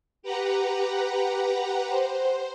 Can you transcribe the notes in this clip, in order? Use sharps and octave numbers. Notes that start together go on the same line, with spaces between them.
G4 B4 F#5 A#5
C5